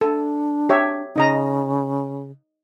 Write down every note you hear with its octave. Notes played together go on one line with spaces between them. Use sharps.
D4 A4
G4 C#5 E5
C#3 D#4 D#5 A#5